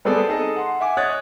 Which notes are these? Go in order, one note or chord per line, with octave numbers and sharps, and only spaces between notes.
G3 B3 C4 G#4 A4 D5
D#4 G#4 A4 D#5
F#5 C6
E5 F#5 G#5 D6
C#5 D#5 D#6 F#6 A6